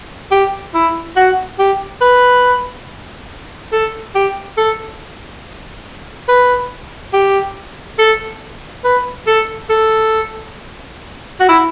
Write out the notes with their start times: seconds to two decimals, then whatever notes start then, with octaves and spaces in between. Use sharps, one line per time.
0.31 G4
0.74 E4
1.16 F#4
1.59 G4
2.01 B4
3.72 A4
4.15 G4
4.57 A4
6.28 B4
7.13 G4
7.99 A4
8.84 B4
9.27 A4
9.70 A4
11.40 F#4
11.49 E4